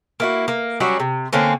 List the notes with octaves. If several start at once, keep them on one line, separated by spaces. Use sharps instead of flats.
A#3 E4 F#4
A#3
F#3 G3 C#4 F#4
C3
D3 A#3 C4 C#4